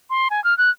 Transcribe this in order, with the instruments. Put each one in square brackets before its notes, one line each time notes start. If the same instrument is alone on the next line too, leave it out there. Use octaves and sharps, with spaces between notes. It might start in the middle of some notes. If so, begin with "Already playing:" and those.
[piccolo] C6
G#5
F6
F#6